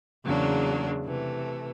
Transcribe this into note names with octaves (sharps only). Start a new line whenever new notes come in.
E2 C#3 F#3 A#3 D4
C3 E3 A3